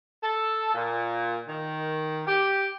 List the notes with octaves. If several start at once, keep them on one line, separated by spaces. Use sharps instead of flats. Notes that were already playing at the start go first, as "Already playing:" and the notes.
A4
A#2
D#3
G4